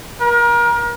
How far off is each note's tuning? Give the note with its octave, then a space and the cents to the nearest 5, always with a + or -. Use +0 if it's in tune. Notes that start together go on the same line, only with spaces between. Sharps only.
A#4 +30